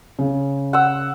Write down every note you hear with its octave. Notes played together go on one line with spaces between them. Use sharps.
C#3
F#5 E6